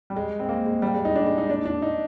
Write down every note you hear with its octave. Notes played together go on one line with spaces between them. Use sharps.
G3
G#3
C4
A#3
G#3
G3
G#3
D#4
D4
G#3
D#4
D4
D4
D#4